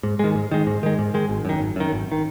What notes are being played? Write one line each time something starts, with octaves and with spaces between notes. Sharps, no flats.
G#2
D#3 G#3
G#2
D#3 G#3
G#2
D#3 G#3
G#2
D#3 G#3
G#1
F#2 D#3
G#1
F#2 D#3
G#1
D#3